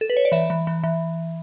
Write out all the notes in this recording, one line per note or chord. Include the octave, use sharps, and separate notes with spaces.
A4
B4
C#5
D5
E3 E5
E3
E3
E3